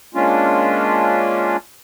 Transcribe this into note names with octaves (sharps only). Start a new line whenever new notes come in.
G#3 A#3 C#4 D4 F4